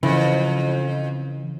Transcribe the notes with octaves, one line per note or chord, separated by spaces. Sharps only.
F2 C#3 E3